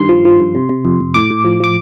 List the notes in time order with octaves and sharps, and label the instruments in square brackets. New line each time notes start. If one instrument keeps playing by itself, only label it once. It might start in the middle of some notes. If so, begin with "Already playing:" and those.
Already playing: [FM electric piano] G2 D#3 C6
F3
F3
G2
C3
C3
F2
F2
A2 D6
A2
F3
F3 D6